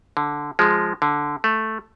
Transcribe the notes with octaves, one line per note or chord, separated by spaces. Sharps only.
D3
F3 G#3
D3
A3